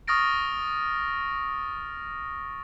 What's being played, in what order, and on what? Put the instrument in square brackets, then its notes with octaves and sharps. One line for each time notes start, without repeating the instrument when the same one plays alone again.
[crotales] C#6 D#6 F6 A6 A#6 D7